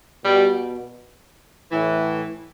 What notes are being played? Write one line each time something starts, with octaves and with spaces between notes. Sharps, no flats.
B2 G3
A2 E3